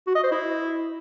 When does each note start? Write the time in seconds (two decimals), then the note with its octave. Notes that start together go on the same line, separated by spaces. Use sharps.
0.07 F#4
0.15 D#5
0.23 C5
0.31 E4